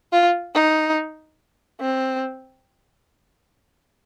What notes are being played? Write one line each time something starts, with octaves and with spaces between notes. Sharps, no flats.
F4
D#4
C4